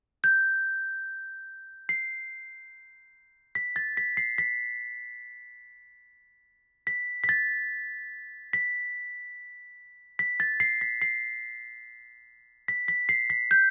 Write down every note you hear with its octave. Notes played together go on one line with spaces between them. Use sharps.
G6
C7
B6
A6
B6
C7
B6
B6
B6
A6
B6
B6
A6
C7
B6
C7
B6
B6
C7
B6
G6